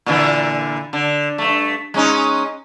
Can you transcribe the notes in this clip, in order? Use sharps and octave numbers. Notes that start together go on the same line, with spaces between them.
A#2 D3 E3
D3
G2 A3
G#3 C#4 D#4